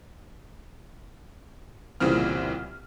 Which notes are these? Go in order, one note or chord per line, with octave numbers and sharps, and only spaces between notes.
C2 A#2 C#3 E3 C4 F6